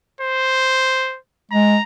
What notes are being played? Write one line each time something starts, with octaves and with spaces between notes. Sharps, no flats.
C5
G#3 A#5